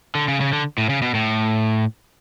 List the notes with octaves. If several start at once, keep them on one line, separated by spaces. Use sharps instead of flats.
D3
C#3
C#3
D3
A2
C#3
B2
A2